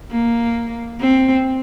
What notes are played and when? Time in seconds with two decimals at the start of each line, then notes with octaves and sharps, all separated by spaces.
0.11 A#3
1.00 C4